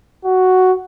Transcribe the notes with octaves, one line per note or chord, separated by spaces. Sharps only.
F#4